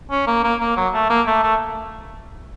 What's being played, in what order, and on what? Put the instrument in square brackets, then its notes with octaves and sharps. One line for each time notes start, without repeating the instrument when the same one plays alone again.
[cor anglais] C#4
A#3
A#3
A#3
F#3
A3
A#3
A3
A3